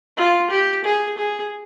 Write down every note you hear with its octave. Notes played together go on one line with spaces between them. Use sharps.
F4
G4
G#4
G#4